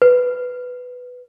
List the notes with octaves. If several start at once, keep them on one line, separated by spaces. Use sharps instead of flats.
B4